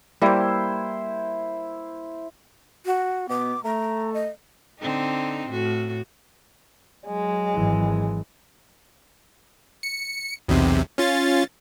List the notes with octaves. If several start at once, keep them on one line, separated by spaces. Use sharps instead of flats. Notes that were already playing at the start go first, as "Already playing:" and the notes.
G3 A#3 E4 C5
F#4
B2 B3 D6
A3 A#5
D#5
D3 C4 D#4
A2 F#4
F#3 G#3
G#1 E3
C#7
B1 E2 C3
C#4 F4 A6